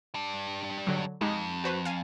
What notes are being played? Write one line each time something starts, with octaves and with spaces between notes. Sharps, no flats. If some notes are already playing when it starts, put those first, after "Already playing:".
G3 D4
D3 F#3
F2 G#3 D#4 G4
F#4 B4 C5
F5 G#5